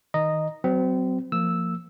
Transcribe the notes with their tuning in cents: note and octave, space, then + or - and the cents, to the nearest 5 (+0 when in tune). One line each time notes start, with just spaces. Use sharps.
D#3 +20 D#5 -10 A#5 +0
F#3 +25 C4 -30
F3 +0 A#3 -25 E6 -5